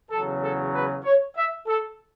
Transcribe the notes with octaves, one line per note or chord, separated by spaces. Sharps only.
E2 C#3 F#3 A4
A4
B4
C#5
E5
A4